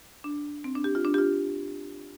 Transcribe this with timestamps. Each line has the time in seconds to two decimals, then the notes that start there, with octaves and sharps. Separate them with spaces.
0.24 D4
0.64 C4
0.75 D4
0.84 G4
0.95 F4
1.05 D4
1.14 G4
1.18 F4